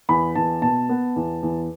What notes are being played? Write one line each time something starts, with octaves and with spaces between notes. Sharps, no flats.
E2 B5
E2 A5
B2 A5
B3
E2
E2